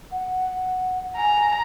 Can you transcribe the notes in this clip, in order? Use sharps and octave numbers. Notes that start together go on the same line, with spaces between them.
F#5
G#5 A#5